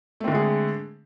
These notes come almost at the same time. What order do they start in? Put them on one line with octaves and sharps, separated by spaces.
A3 C4 D3 G#3 G#4